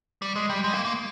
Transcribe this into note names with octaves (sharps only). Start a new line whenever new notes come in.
G3
G#3
G3
G#3
A#3
A#3